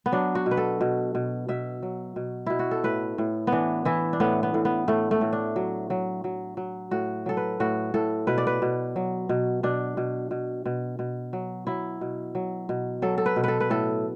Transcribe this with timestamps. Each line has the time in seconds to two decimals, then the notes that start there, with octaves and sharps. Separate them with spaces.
0.06 B3
0.12 F#3 D4
0.35 F#4
0.46 B2
0.51 B4
0.57 A4
0.81 B2
1.15 B2
1.48 B2 E5
1.82 F#3
2.16 B2
2.46 B2 E4
2.59 F#4
2.71 A4
2.84 A2 B4
3.18 A2
3.47 B3
3.52 E3 D4
3.85 E3 E4
4.13 D4
4.20 A2 B3
4.43 B3
4.54 A2
4.65 B3
4.88 A2 A3
5.11 A3
5.21 A2
5.33 D4
5.56 F#3
5.90 F#3
6.24 F#3
6.57 F#3
6.91 A2 F#4
7.26 F#3 A4
7.37 B4
7.60 A2 F#4
7.94 A2 A4
8.27 B2 B4
8.38 D5
8.47 B4
8.62 B2
8.96 F#3
9.29 B2
9.63 B2 D4
9.97 B2
10.31 B2
10.66 B2
10.99 B2
11.33 F#3
11.67 F#3 E4
12.01 B2
12.35 F#3
12.69 B2
13.02 F#3 A4
13.18 A4
13.26 B4
13.36 B2
13.44 A4 B4
13.60 B4
13.70 A2 A4